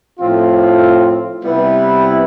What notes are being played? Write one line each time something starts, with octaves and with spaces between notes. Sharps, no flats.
A2 F3 C4 F4
C3 G3 B3 E4 B4